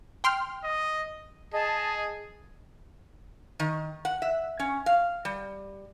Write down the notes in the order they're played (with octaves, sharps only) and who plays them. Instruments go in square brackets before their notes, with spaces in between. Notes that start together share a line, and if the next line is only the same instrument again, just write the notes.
[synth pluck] G5 C6 F6
[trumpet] D#5
[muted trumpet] G#4 [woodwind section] D#5 A5
[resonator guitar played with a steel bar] D#3
F#5
E5
C#4
F5
G3